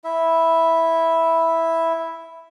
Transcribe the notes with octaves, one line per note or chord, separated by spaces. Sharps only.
E4 E5